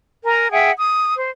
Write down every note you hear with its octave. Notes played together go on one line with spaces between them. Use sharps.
A#4 G#5 A#5
G#4 E5 F#5 G5
D#6
C5